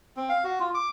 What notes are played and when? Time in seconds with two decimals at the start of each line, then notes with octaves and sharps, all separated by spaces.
0.17 C4
0.29 F5
0.44 F#4
0.60 F4
0.74 D6